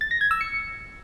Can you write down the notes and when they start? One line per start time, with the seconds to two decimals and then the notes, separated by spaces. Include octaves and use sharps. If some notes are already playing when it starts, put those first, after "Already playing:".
0.01 A6
0.11 A#6
0.21 G#6
0.31 E6
0.41 C#7